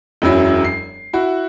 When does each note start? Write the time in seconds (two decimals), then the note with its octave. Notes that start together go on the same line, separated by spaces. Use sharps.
0.22 E1 F#2 F#3 E4
0.64 C7
1.13 E4 F#4